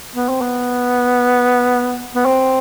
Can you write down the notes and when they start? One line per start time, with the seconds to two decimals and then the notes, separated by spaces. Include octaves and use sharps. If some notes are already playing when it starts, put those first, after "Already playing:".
0.15 B3
0.29 C4
0.41 B3
2.15 B3
2.26 C4